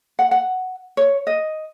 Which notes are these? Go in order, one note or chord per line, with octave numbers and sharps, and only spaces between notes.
F#5
F#5
C#5
D#5